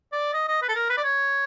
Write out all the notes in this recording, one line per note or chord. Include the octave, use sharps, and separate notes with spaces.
D5
D#5
D#5
B4
A4
A#4
B4
D5
C#5